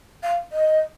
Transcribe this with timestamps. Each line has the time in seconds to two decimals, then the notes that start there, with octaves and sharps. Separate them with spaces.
0.23 F5
0.52 D#5